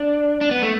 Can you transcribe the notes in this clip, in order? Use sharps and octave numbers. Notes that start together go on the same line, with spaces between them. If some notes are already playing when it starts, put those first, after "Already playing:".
Already playing: D4
D4
B3
A3